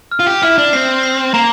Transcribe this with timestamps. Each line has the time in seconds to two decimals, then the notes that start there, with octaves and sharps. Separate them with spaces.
0.11 F6
0.19 F4
0.26 G4
0.43 E4 F6
0.58 D4
0.73 C4 C7
1.03 C7
1.34 A#3 A#5